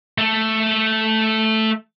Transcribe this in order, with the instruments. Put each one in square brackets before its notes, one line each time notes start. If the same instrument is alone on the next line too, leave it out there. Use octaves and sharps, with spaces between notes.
[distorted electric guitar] A3 A4